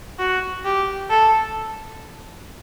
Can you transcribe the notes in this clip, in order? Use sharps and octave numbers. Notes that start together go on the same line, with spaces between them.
F#4
G4
A4